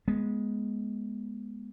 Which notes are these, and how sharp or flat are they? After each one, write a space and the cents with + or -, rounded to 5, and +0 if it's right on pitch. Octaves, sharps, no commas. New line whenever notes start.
G#3 +5 B3 -20